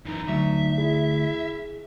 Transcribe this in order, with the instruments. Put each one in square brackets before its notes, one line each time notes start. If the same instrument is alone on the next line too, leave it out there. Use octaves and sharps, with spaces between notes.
[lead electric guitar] F#2 E3 [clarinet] D#4
[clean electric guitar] D2 [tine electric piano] F#3 [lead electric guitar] E5
[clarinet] E4 [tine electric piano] G#4